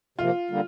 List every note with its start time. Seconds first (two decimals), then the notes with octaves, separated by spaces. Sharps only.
0.18 C3 F3 A#3 F4
0.50 D3 G3 A#3